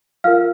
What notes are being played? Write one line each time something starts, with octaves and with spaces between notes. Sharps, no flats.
F4 A#4 F5 F6